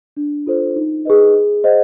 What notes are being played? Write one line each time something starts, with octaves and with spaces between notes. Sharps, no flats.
D4
F4 A4 C5
D#4
G#4 B4 D#5
G#4
C5 D#5 F#5